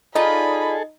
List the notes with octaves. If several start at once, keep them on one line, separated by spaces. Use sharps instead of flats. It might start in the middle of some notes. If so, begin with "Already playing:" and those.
D#4 F4 G#4 A4 D5 D#5 B5